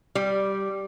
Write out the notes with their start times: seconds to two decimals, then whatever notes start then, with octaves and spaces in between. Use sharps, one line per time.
0.15 G3